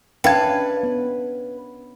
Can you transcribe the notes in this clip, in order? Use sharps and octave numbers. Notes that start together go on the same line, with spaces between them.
C#4 D4 B4 E5 F5 G5 G#6
B3